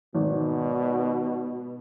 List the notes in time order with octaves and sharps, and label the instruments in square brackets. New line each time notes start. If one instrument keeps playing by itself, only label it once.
[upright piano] G#1 [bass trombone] B2